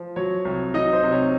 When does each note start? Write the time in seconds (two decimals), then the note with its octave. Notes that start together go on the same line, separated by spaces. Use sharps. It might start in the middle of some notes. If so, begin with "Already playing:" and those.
Already playing: F3
0.16 F#3 C#5
0.45 C2
0.74 F#3 D#4 D#5
0.93 C5
1.03 C3
1.12 C#5